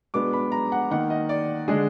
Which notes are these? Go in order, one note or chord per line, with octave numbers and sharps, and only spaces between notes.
B2 G#3 B3 D4 D6
B5
A#5
F#5
D#3 A#3 D#4 F#5
D#5
D5
D3 G#3 D4 G#4